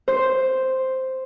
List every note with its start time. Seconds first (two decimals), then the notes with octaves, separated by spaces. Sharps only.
0.08 C5